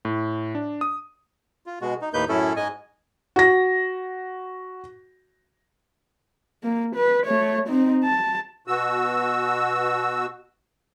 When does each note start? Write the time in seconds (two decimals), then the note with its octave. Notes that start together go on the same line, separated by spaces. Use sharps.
0.05 A2
0.55 D4
0.81 D#6
1.66 F4
1.81 B2 G#3 F#4
2.02 D#4
2.14 D#2 A2 A#3 D#4 B4 G6
2.29 F#2 A2 C#4 E4 A4
2.56 G#2 G#3 D#5 G#5
3.36 F#4 A#6
6.63 A#3
6.96 B4
7.26 A3 C#5
7.69 C4 D#4
8.05 A5
8.67 B2 F#4 E6